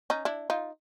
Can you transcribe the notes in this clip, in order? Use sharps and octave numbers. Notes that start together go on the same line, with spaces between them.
C#4 D#4
D4 E4
D#4 F4